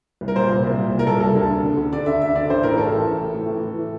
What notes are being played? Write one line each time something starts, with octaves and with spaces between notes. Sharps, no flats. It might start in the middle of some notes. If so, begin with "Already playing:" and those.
C2
A#4
A#2 C5
A#2
C2
A#2
C2
A#4
A#2 A4
C2 A4
D2
D2
D3
D3
D3 D5
D2 E5
D2 E5
D3 D5
A1 C5
A2 A#4
A1 A4
E3
A1
A2
A2
E3
E3
A2